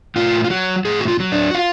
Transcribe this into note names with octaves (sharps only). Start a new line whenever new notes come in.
A2 F4
F4
F#3 F#4
A2 G#4
F#4
F4
F#3
D4
F#4
F4